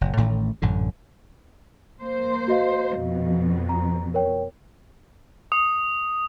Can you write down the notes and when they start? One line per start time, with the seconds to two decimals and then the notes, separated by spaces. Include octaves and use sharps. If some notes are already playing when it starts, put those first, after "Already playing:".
0.01 F#1 A#2
0.17 A1 A2 D#3 A3
0.62 A1 F#2 A#2 D3
2.01 A#3 C5
2.48 F#4 D#5 F5
2.97 F2 B2
3.69 A#5
4.14 A#4 C#5 G5
5.52 D#6